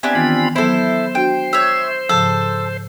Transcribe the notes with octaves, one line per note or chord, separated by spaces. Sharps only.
B3 C4 D4 G4 E5 G#5
D#3 E3 B3 C4 F4 B5
F#3 B3 E4 A4 C5
D4 F#4 G5
C#5 E5
G#2 C#3 F3 A4